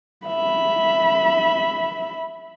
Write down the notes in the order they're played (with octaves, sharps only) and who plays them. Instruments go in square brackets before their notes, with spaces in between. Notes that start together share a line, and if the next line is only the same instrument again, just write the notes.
[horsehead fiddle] E5 B5